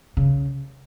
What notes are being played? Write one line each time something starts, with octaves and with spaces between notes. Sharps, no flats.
C#3